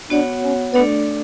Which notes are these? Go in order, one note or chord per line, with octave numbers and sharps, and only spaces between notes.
B3 D4 F#4 C#5 F#5
C#4
A3 B3 D4 A4 D5